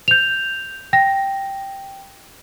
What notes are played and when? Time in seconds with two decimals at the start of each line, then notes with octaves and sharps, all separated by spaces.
0.08 G6 F7
0.93 G5 A#6